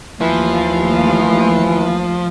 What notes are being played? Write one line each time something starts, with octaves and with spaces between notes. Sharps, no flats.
D#2 E3 F3 A3 F5